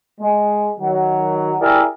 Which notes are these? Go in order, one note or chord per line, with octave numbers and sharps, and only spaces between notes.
G#3
D#3 F#3
E4 G4 G#4 A#4 D5 E5